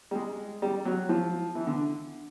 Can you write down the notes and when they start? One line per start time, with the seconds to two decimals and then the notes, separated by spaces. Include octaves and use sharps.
0.11 G3
0.15 G#3
0.62 G3
0.85 F#3
1.09 F3
1.55 E3
1.67 D3